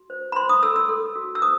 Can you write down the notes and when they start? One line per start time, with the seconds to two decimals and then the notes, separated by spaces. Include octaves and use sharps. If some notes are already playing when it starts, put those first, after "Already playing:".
Already playing: F#4
0.10 C5
0.32 B5
0.36 C5 C6
0.49 D#6
0.63 A4 E6
0.76 E6
0.89 A4
1.16 F#4
1.35 E6
1.42 C5 D#6